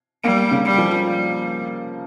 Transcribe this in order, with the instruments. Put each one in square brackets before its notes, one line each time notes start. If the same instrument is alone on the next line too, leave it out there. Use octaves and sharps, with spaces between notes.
[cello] G3 [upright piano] A#3
[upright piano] C#3
[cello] G3
[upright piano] F3
[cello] G3